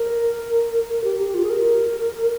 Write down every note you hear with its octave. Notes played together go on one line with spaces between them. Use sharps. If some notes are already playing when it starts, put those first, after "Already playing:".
Already playing: A#4
A#4
G4
G4
F4
G#4
A#4